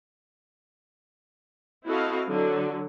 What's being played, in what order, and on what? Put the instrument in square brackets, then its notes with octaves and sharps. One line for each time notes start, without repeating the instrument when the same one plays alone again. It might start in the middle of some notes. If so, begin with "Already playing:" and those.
[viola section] C4 E4 F#4 A4 D#5 F5
D3 F#3